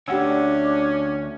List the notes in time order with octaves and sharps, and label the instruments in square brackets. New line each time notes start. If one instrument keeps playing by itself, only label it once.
[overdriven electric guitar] D2 [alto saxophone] C#4 [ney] D4 [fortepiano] G4 F#5 E6